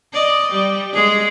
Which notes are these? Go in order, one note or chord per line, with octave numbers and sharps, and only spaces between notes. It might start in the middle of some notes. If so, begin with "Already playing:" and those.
D5 D#5
G3
G#3 G#4